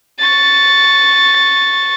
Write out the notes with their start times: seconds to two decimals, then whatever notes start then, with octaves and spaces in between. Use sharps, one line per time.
0.20 C#6 A6